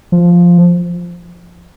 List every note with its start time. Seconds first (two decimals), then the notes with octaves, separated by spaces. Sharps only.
0.12 F3